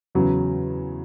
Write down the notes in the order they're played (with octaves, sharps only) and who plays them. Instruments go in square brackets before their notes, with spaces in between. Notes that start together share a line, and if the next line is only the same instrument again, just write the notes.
[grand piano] E2 C#3 F#3